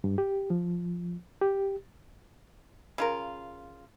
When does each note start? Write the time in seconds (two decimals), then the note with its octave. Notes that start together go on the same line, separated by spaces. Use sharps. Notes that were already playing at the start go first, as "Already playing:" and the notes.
0.04 G2
0.18 G4
0.50 F3
1.42 G4
2.98 C#3 F4 A#4